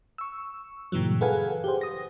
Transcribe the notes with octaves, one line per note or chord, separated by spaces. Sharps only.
C#6 E6
G2 A#2 C#3 E3 F#3
G#4 A4 B4 F5 F#5 G#5
G4 G#4 C5
D#6 A#6